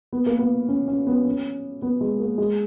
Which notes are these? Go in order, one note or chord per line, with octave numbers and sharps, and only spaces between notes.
B3
A#3
B3
C#4
C#4
B3
C#4
B3
G#3
A#3
G#3